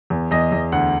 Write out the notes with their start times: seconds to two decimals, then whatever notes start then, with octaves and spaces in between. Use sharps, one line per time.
0.10 E2
0.31 E2 D#5
0.52 E2
0.72 D2 F#5